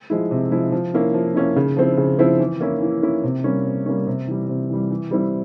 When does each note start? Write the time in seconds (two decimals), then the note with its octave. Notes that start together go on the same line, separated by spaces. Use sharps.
0.10 F3 G#3 E4
0.31 C3
0.51 F3 G#3 E4
0.72 F3
0.94 A#3 C#4 E4
1.14 F3
1.35 A#3 C#4 E4
1.56 C#3
1.76 F3 C4 E4
1.97 C#3
2.19 F3 C4 E4
2.40 E3
2.61 A#3 C#4 E4
2.82 E3
3.02 A#3 C#4 E4
3.24 C3
3.44 G3 A#3 C#4
3.66 C3
3.86 G3 A#3 C#4
4.07 C3
4.27 E3 G3
4.49 C3
4.70 E3 G3
4.91 E3
5.11 G3 C4 E4